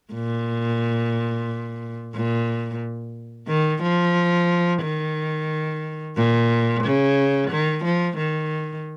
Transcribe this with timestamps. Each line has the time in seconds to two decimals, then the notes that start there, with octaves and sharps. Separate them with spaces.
0.14 A#2
2.15 A#2
3.48 D#3
3.83 F3
4.83 D#3
6.17 A#2
6.84 C#3
7.51 D#3
7.85 F3
8.17 D#3